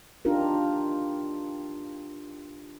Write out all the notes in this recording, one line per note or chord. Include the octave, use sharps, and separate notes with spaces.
D4 D#4 F4 G4 A#4